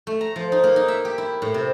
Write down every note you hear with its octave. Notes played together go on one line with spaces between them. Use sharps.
A3
A#5
F3
D#4
A#3
D#4
E5
G4
E4
A2
C3